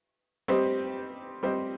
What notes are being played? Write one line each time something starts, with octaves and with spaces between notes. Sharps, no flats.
G3 C4 G4 C5 D#5
G3 C4 G4 C5 D#5